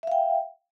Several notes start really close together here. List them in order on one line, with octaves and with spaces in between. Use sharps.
E5 F5 G5